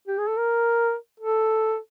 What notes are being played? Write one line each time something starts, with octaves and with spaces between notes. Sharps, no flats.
G4
G#4
A4
A#4
A4